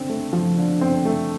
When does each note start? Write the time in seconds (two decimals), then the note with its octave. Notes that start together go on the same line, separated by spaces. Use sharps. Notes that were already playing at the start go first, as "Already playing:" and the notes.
Already playing: D3 C4
0.09 A3
0.33 F3
0.57 D3
0.81 C4
1.05 A3